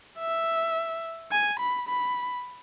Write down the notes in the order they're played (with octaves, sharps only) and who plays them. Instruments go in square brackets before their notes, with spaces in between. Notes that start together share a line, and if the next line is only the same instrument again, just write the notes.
[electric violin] E5
G#5
B5
B5